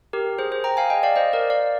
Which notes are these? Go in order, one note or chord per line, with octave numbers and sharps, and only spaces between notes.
G4 A#4
G#4 C5
G#4 C5
G5 A#5
F5 G#5
D#5 G5
D5 F5
C5 D#5
A#4 D5
D5 F5